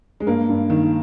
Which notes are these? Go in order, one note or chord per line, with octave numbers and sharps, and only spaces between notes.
G#3
G2 A#3
G2
D#3